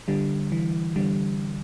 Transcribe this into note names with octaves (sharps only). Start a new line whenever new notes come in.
D3 G3
E3
D3 G3